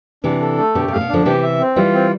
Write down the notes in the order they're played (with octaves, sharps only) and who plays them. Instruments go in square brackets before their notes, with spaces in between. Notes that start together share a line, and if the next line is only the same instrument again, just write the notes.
[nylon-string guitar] C3 E3 [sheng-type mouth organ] D4
[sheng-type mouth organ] A4
A3
[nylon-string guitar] B2 D3 [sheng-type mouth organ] G4
[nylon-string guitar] C3
[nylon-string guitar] A2 [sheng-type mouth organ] F5
[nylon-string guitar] B2
[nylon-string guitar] D3 F3 [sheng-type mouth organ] D4
[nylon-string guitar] C3 E3 [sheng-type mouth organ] G4
[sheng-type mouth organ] E5
C4
[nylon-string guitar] E3 G3 [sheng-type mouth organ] F4
[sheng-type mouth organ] C4